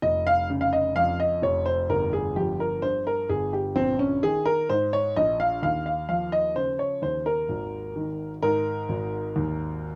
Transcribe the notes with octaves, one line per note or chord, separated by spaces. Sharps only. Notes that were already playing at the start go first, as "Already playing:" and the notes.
F1 D#5
F5
C#3
F5
D#5
F2 F5
D#5
F1 C#5
C5
G1 A#4
G#4
F3 G4
A#4
G2 C5
A#4
G1 G#4
G4
A#1 C4
C#4
D#3 G#4
A#4
G#2 C5
C#5
A#1 D#5
F5
D#2 F5
F5
F3 F5
D#5
C#3 C5
C#5
D#2 C5
A#4
G#1
D#3
G#2 A#4
G#1
D#2